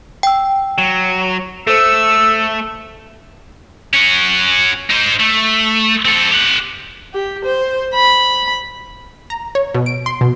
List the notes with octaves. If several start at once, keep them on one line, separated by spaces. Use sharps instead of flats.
G5 E6
F#3
A3 A4 C5 E6
C#4 F#4
D#4 C5
A3
C4 A4
G4 F#5
G4
C5
B5
A#5
C#5
B2
D7
C6
B2